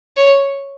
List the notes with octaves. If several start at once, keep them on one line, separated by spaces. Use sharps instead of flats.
C#5